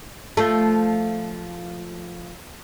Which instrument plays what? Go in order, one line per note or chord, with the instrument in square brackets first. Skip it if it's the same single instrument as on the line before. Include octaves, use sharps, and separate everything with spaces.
[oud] F3 A3